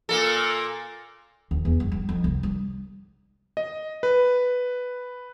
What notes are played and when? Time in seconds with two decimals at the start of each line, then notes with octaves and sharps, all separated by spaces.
0.09 A#2 A#3 A4
1.51 D2
1.65 E2
1.80 G2
1.92 G3
2.09 F2
2.24 C2
2.43 G3
3.57 D#5
4.03 B4